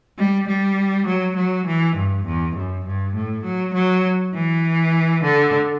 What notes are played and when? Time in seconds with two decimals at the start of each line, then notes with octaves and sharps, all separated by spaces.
0.19 G3
0.48 G3
1.07 F#3
1.37 F#3
1.67 E3
1.96 G2
2.27 E2
2.56 F#2
2.86 G2
3.15 A2
3.45 F#3
3.74 F#3
4.35 E3
5.24 D3